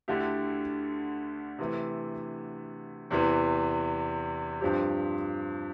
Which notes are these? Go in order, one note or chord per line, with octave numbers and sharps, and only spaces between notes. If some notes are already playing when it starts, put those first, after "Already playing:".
D2 D3 A3 E4 G4
C3 E3 A3
E2 C3 E3
G2 F3 C4 G4